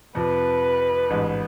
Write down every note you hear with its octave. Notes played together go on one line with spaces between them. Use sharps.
F2 C3 F3 B4
A1 G#2 G#3